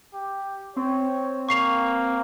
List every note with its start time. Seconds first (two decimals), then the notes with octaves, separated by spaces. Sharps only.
0.14 G4
0.76 C4 C#5
1.49 A#3 C#6 C7 F7